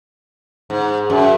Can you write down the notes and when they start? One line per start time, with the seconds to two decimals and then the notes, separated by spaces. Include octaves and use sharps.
0.70 G#2
1.10 F#2